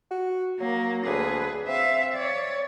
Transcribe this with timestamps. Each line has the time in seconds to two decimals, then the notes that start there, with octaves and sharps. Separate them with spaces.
0.11 F#4
0.60 F#3 A#3
1.06 D2 G#4 B4
1.68 C4 E5 F5
2.15 C#5 D5